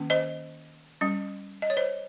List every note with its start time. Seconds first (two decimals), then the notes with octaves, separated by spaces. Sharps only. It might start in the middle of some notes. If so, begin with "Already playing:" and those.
Already playing: D#3 A#3 C#4
0.10 C5 D#5
1.01 G3 C#4
1.62 D#5
1.70 C#5
1.77 C5 D#5